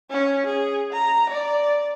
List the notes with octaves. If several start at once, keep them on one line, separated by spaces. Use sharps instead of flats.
C#4
G#4
A#5
D5